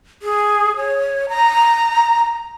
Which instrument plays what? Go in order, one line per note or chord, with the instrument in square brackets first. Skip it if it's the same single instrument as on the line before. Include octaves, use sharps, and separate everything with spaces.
[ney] G#4
C#5
A#5